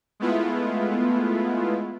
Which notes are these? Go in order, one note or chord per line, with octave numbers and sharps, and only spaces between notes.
G#3 A3 B3 E4 F4